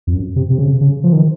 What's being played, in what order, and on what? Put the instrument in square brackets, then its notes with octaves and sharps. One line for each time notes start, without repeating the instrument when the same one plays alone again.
[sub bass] F2
F#2
C3
C3
C#3
C#3
F3
D#3